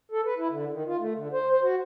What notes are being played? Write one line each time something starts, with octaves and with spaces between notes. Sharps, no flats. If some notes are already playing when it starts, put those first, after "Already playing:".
A4
B4
E4
D3
D#3
F4
A3
D3
C5
C5
F#4